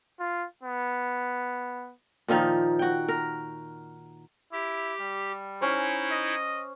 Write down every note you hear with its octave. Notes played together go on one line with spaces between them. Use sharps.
F4
B3
A#2 D#3 F3 D#4
F#4 G5
A#4
E4 G4
G3
C#4 D#4 E4 C5
D#5